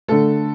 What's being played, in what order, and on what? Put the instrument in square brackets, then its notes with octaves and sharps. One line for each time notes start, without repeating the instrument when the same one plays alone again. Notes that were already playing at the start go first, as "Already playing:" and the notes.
[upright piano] D3 A3 A4